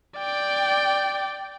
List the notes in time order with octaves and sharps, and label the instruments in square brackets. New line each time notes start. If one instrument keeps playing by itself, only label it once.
[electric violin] D5 G5